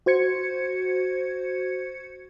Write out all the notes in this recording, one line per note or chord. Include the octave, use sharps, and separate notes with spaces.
F#4 C5 G#6 C#7